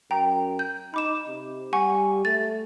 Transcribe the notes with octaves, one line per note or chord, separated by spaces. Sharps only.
F#2 G5 A#5
G6
D#4 B5 D6 E7
C3
G3 F#5 G#5 C#6
A3 A6